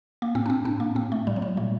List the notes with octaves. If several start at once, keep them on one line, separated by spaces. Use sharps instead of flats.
A#3
A2 C4
D4
C4
A2 D4
A#3
A2 C4
A3
A2 G3
F#3
G3
A#2 A3